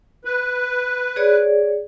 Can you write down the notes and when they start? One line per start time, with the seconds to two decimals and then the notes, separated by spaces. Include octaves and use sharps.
0.25 B4
1.16 G#4 C#5 D5